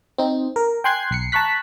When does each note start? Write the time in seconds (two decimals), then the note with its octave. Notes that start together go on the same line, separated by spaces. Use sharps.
0.18 C4 D#4
0.56 A#4
0.84 G5 G#5 C6 F#6 G#6 C7
1.11 B1 C7 C#7
1.32 A5 A#5 C#6 F#6 B6